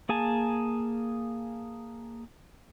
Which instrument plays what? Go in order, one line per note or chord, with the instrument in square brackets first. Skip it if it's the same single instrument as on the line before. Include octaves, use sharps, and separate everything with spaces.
[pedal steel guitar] A#3 G#4 G#5 A5